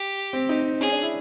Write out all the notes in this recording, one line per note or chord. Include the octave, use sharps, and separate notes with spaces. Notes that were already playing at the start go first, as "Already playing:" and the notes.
Already playing: G4
C4
D#4
C#4 G#4
D4
E4